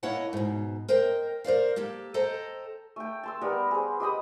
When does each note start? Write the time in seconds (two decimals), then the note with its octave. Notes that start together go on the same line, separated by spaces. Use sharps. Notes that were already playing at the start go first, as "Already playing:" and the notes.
0.03 A#3 E4 C#5 D#5 F#5 A5
0.33 G#2 B2
0.89 A#4 C5 D#5 G5
1.44 A#4 C5 D5 F5
1.76 A#3 G4 A4
2.14 A4 C5 D#5 G5 A#5
2.96 A3 G5
3.23 A5 C6 E6
3.41 G3 B3 A#4 F#5
3.71 G#4 C5
4.00 G4 D#5 B5 D#6